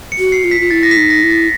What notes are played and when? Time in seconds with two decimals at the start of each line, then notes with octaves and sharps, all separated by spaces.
0.12 C#7
0.19 F#4
0.32 C7
0.44 F4
0.51 B6
0.60 F4
0.70 E4 A6
0.83 A#6
0.91 B6
0.97 D#4
1.10 A#6
1.23 E4
1.30 A6